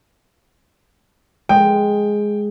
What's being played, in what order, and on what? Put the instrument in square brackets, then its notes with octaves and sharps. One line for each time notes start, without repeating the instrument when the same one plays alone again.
[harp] G#3 [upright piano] G5